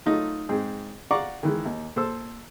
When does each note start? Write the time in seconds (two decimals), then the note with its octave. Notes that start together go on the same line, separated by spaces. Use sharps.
0.06 F#3 A3 D#4 F4
0.49 G#2 C4 G#4
1.11 D5 F5 F#5 A#5 C#6 D6
1.43 D#3 E3 G#3
1.65 D#2
1.96 A#2 A4 C5 E6